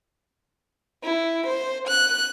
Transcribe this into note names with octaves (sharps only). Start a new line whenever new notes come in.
E4
C5
F#6